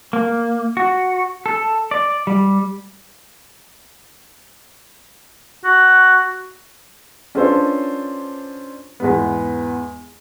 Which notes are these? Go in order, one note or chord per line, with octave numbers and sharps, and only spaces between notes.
A#3
F#4
A4
D5
G3
F#4
C#4 D4 F4 A4 B4 C5
E2 G#2 B3